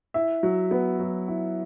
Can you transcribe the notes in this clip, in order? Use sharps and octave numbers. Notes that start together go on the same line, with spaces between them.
E4 E5
F#3
B3
F#3
E4